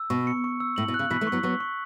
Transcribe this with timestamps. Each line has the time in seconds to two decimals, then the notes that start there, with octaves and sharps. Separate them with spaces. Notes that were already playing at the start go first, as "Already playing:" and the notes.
Already playing: E6
0.10 B2 C#6
0.27 C#7
0.44 C#6
0.60 E6
0.76 A2 F#7
0.88 B2
0.94 F#6
0.99 C#3
1.10 B2 E3 B6
1.21 E3 A3
1.27 C#6
1.32 F#3 B3
1.43 F#3 B3 C#6
1.60 C#6